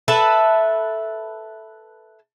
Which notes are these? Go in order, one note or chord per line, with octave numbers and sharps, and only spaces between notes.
A4 B4 E5 A5